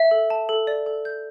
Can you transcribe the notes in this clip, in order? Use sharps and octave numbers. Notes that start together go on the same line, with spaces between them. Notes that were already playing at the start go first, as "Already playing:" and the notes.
Already playing: E5
A4
A5
A4
D5
A4
G6